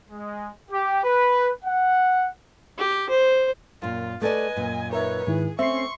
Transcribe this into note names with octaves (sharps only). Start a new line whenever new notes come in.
G#3
G4
B4
F#5
G4
C5
F#2 A#2 F4
A3 A4 B4 D5 D#5 G#5
F#2 A#2
D#4 A#4 B4 C#5 E5
G#2 D#3 E4 G#4
A3 C4 C#4 E5 C6 C#6 C7